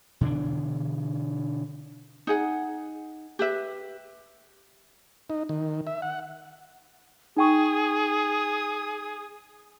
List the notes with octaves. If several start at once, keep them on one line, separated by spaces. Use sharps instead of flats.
B2 D3 E3 D4
D#4 G#4 F#5
G4 B4 E5
D#4
D#3
E5
F#5
D#4 G#4 G5 C#6 D#6